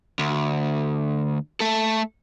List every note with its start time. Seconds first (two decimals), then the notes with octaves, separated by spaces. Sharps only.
0.19 D2
1.60 A3 A4